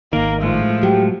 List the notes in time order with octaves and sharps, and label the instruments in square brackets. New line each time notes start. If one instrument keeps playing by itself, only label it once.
[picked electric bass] G#1 D#3 [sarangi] A#3 [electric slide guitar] A#4
[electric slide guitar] A2 G#3 A3 [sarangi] F3
[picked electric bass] F#3 [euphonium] G4